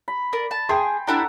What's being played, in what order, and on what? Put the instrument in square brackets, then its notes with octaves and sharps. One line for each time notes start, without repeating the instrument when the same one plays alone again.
[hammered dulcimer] B5
[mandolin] A#4 D5
A5
[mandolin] G#4 [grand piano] G5 A5 C6
[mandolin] D4 E4 G4 [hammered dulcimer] A4 F#5 A#5